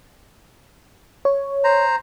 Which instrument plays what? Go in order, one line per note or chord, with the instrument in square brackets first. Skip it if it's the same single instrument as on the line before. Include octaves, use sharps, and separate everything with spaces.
[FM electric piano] C#5
[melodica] C5 A#5